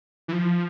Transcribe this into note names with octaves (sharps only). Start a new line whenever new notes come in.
E3
F3